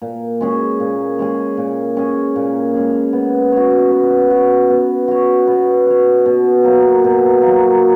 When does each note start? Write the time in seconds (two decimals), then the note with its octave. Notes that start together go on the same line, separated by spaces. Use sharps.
0.02 A#2
0.41 G#3 C#4 G#4
0.80 A#2
1.19 G#3 C#4 G#4
1.57 A#2
1.96 G#3 C#4 G#4
2.36 A#2
2.74 G#3 C#4 G#4
3.13 B3
3.52 F#4 C#5
3.91 B3
4.30 F#4 C#5
4.70 B3
5.08 F#4 C#5
5.48 B3
5.86 F#4 C#5
6.26 B2
6.64 F#3 A#3
7.04 B2
7.42 F#3 A#3